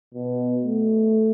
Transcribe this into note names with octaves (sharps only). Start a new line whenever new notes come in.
B2
A3